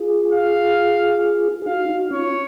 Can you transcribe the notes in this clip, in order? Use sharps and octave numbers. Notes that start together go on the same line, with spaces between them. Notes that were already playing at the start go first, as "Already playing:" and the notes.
Already playing: F4 G#4
F5
G#4
D#4 F#4 F5
D#4 F#4
C#4 F4 C#5